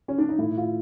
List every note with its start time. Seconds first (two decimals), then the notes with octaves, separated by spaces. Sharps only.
0.08 C#4
0.18 D4
0.29 D#4
0.38 A2 E4
0.57 F4